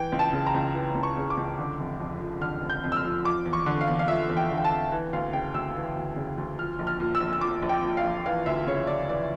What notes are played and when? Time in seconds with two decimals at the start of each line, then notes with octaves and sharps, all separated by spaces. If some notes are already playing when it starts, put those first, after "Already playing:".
Already playing: E3 G5
0.12 C#2
0.19 A5
0.33 C#3
0.46 A#5
0.54 C#2
0.74 E3
0.95 C#2
1.03 C#6
1.17 C#3
1.30 D6
1.37 C#2
1.59 D3
1.79 F1
2.00 F2
2.20 F3
2.41 D3 F6
2.62 F1
2.70 G6
2.84 F2
2.92 E6
2.96 F6
3.04 F3
3.25 F3 D6
3.45 E2
3.53 C#6
3.66 D3
3.81 F5
3.88 E2
3.99 F5
4.08 F3 E5
4.29 E2
4.37 G5
4.51 D3
4.57 G5
4.64 A5
4.71 E2
4.92 E3
5.13 D2 F5
5.33 C#3 G5
5.54 D2 E6
5.75 E3
5.96 D2
6.16 C#3
6.38 D2
6.58 F3 F6
6.79 A#1
6.87 F6
7.00 A#2
7.15 E6
7.20 A#1
7.33 E6
7.41 F3 D6
7.62 A#1
7.69 G5
7.83 A#2
7.97 F5
8.04 A#1
8.26 E3 F5
8.46 D2 E5
8.67 C#3 C#5
8.87 D2 D5
9.09 E3 D5